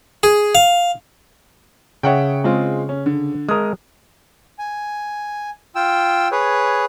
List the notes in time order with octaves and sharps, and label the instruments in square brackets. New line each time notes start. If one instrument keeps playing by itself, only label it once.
[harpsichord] G#4
F5
[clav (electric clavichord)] C#3 C#5 [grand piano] E5 F#5 G5
[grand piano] G#3 C4 F4
C#4
D3
[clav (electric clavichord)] G#3 A#4 [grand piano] D#6
[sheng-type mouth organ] G#5
F4 G5 E6
G#4 B4 C#5